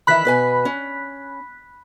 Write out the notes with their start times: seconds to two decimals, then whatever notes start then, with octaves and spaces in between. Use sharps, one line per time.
0.07 D#3 E3 E5 B5 F#6 B6
0.25 B2 B4 G#5
0.65 C#4